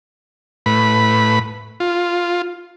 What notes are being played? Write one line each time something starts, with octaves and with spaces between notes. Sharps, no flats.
A2 B4 B5
F4